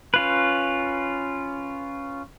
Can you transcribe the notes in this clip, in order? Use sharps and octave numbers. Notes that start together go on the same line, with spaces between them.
C#4 F4 B4